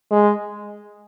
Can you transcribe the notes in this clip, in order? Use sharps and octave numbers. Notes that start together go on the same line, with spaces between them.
G#3